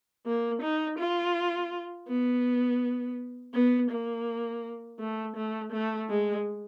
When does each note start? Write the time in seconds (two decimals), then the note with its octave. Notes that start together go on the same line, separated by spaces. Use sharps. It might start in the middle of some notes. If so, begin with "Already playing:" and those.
0.26 A#3
0.62 D#4
0.99 F4
2.08 B3
3.54 B3
3.90 A#3
4.99 A3
5.36 A3
5.72 A3
6.09 G#3